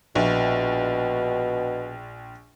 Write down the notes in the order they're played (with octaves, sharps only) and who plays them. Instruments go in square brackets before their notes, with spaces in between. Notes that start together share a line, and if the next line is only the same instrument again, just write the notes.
[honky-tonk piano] A#1 [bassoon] B2